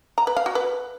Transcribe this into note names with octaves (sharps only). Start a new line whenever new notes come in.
A#5
B4
F5
F#4
B4